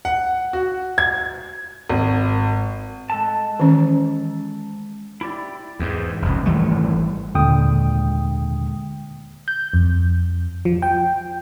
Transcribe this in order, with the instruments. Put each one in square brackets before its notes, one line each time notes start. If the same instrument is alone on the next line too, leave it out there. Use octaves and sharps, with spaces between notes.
[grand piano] F#5
F#4
G#6
G#1
[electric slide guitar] G#3 A4 A5
[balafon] D#3 E3 C#4
[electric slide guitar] E4 G4 D5
[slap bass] E2 G#2
F1 C#2
G#1 E3 G3 A3
[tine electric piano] D#2 A#2 D3 G#3 G5 D#6
[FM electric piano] G6
F2
F3
G5